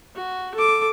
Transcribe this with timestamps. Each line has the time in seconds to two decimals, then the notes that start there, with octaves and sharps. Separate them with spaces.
0.16 F#4
0.55 A4 D6